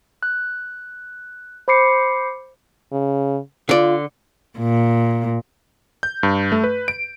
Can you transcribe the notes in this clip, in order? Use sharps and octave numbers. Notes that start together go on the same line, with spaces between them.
F#6
C5 B5 D6 C7 C#7
C#3
D3 F4 D5
A#2
G6
G2
A3
B4
D7